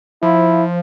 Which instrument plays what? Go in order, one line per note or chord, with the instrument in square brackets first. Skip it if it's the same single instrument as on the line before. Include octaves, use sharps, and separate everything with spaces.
[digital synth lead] F3 [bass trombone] E4